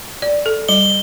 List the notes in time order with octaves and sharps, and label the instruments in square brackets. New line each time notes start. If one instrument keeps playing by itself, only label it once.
[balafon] D5
A4
[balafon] G3 [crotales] G7